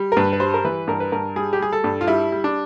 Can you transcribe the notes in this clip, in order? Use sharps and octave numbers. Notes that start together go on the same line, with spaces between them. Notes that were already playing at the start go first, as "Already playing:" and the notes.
Already playing: G3
A#4
G2 B4
B4
G3 C5
A#4
E3 B4
G2 A#4
B4
G2 A#4
G3 G#4
G4
G3 G#4
A4
G2
F4
G3 E4
G3
D4